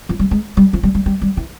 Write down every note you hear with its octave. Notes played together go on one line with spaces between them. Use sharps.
F3
G3
G#3
G3
F3
G3
G3
G3
G3
E3